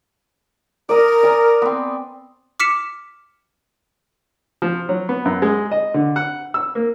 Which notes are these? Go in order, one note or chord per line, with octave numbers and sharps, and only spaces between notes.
A#4 D5 D#6
D5 G#5 D#6
B3 C4
D6 F6 B6 C#7 E7
F3
F#3
B3
F#2
G#3
D#5
D3
F#5
E6
A#3